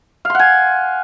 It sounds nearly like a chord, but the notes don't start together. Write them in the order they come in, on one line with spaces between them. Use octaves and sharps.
F5 C6 F#5 G#5